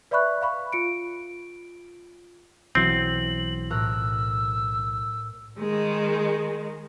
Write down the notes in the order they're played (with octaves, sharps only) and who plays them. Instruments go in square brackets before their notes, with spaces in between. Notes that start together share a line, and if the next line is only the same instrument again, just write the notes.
[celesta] B4 D5 E5 B5 C#6 F#6
F5 B5 C#6
F4 C#7 D7
[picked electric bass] B1 E3 F#3 [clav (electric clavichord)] C4 [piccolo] F#7
[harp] A2 A#4 F#6 [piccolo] E6
[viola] D#3 G#3